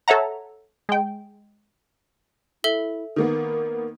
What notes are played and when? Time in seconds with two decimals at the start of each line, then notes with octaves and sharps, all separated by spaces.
0.08 A4 C#5 E5 F#5 A#5
0.89 G#3 G5
2.64 E4 A4 E5 G7
3.16 D#3 A#3 B3 A#4